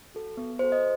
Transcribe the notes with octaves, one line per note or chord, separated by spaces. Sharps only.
F#4 A4
B3
F#4 A4 C5
D#5